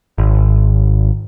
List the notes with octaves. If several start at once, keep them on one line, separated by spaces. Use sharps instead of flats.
G#1